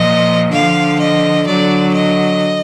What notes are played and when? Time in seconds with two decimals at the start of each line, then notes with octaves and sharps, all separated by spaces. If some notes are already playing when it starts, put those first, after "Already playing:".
Already playing: A#2 F3 D#5
0.50 D3 F3 F5
0.98 D#5
1.45 D3 F#3 D5
1.94 D#5